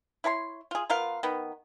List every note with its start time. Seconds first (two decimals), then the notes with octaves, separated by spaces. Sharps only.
0.24 E4 C#5 A5 C6
0.71 F4 G#4
0.90 B3 F4 A#4 F5
1.23 D#3 B3